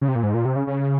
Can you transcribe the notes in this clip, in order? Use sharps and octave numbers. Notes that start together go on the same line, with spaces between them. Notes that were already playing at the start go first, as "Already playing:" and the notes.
C#3
C3
A#2
G#2
A#2
C3
C#3
C#3